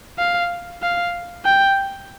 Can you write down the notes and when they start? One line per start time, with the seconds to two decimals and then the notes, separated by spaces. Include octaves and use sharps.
0.19 F5
0.82 F5
1.45 G5